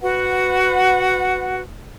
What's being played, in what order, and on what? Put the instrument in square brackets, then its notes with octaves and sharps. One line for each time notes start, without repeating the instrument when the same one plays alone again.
[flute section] F#4 B4 F#5